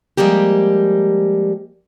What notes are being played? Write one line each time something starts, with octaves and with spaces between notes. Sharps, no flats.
F3 G3 G#3 A#3 G4